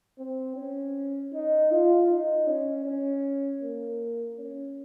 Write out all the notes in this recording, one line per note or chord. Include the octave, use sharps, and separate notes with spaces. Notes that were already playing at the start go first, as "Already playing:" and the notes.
C4
C#4
D#4
F4
D#4
C#4
C#4
A#3
C#4